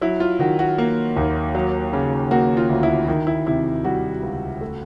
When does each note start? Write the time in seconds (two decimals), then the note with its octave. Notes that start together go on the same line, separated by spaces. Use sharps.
0.01 F#3 E4
0.20 F4
0.39 D#3 F#4
0.59 F#4
0.78 A#3
1.16 D#2
1.55 F#3
1.93 C#3
2.31 A#3 F#4
2.57 F4
2.70 D2
2.83 E4
3.08 D#3 E4
3.27 E4
3.46 C3 E4
3.85 G3 F#4
4.23 C#2
4.61 A3